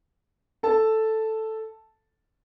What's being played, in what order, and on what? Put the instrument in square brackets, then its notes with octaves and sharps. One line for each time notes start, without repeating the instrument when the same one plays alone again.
[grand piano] A4 A5